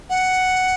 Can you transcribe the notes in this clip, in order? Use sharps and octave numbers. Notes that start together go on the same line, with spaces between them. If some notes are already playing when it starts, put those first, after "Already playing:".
F#5